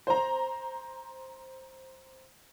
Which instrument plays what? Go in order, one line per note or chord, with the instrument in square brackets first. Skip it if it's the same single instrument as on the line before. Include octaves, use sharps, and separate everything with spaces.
[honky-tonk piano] C5 A#5